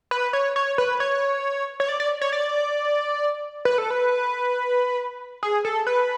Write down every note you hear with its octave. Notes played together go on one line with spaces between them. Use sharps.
B4
C#5
C#5
B4
C#5
C#5
D5
D5
C#5
D5
B4
A4
B4
G#4
A4
B4